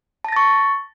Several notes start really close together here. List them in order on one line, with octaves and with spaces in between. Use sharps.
A5 A#6 A6 C#6